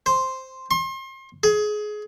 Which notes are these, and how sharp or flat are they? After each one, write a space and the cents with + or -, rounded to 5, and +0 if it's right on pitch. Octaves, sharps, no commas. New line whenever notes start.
C5 +0
C6 +35
G#4 +25